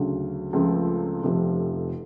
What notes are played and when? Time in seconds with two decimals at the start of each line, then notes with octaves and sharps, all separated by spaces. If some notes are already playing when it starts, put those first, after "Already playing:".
Already playing: D2 C#3 F#3
0.53 C#2 C#3 F3 A3 C4
1.22 F1 F2 C3 F3